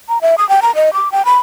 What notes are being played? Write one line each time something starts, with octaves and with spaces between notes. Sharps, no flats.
A#5
E5
D#6
G5
A#5
D#5
D6
G5
B5